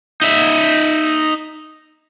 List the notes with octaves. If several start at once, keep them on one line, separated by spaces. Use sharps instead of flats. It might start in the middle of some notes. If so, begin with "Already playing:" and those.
D#4 E5